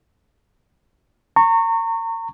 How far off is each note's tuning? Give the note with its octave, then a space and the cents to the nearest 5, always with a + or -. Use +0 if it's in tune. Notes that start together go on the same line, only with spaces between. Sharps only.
A#5 -35 C#6 -10